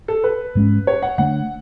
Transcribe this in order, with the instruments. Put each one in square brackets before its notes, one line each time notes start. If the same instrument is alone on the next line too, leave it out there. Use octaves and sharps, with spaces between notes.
[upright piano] A4
B4
[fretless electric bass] G#2 G#3 C#4
[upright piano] C#5
F#5
[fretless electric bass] D3 A3 D4 [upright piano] F#5